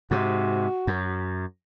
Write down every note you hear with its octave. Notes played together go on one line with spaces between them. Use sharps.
G#2 C3 F#4
F#2